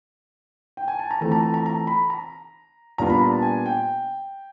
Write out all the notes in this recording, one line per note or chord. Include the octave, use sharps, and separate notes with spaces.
G5
G#5
A5
A#5
E3 A3 C4 F4 A5
A#5
A5
A#5
A#5
B5
A#5
A#2 G3 B3 D4 F4 A#5
B5
A#5
A5
G#5
G5